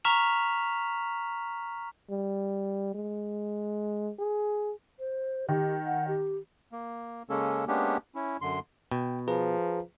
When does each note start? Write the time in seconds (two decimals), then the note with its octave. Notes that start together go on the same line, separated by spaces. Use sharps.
0.05 A#5 C#6 F6 B6 E7 F7
2.10 G3
2.94 G#3
4.19 G#4
4.99 C5
5.49 D#3 G4
5.85 F#5
6.08 G4
6.72 A#3
7.30 C#3 G#3 A#3 C#4 A4
7.68 G#3 A#3 B3 C#4 D4 G4
8.15 C#4 E4
8.41 F#2 D3 C6
8.92 B2 G5
9.28 F3 G#4 B4 A#5